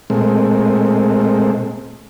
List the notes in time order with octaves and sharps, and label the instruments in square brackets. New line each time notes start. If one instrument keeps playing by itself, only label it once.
[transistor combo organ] A#2 G#3 A3 C4